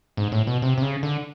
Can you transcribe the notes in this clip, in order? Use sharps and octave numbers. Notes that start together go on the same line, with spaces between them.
G#2
A2
B2
C3
C3
C#3
D3